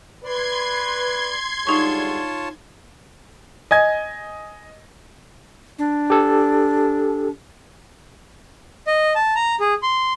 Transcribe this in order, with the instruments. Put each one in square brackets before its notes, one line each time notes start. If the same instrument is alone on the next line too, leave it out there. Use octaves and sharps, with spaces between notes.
[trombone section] B4 [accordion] D5 [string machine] C6 G#6
[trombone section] D3 G3 G#3 [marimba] D#4 C#6 [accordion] F4 C#5 A5
[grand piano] D#5 G#5 G#6
[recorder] D4
[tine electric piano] G4 A4
[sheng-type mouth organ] D#5
A5
A#5
G#4
C6